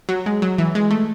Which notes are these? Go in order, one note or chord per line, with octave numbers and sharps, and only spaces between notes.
F#3
G#3
F#3
E3
G#3
A3